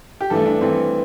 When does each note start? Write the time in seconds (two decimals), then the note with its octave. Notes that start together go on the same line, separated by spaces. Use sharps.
0.21 G4
0.30 G2 E3 A3 A4
0.46 D4
0.61 G2 E3 A3 C4